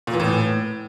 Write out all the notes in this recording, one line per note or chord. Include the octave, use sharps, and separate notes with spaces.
A#2
E3
A2